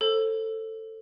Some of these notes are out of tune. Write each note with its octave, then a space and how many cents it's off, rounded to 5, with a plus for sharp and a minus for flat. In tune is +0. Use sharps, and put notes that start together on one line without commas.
A4 +10 C5 +30